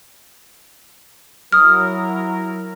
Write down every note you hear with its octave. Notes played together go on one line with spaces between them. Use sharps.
F#3 E4 A#4 D#6 F6